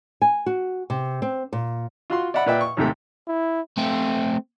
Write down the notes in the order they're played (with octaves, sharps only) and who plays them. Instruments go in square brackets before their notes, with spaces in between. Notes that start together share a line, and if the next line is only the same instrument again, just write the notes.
[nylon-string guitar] G#5
F#4
C3
C4
A#2
[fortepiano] F4 F#4 C6
D5 E5 F#5 B5
A#2 B4 D5 E5 G5
C#6
D#2 G#2 C3 A3 G5
[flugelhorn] E4
[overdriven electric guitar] A3 C4